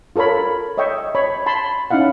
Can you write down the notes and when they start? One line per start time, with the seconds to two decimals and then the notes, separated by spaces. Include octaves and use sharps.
0.16 F4 A4 A#4 C#5 B5
0.77 C#5 D#5 E5 G5 C#6
1.15 C#5 B5
1.46 A5 B5 C6
1.90 C#4 D#4 E4 F5 F#5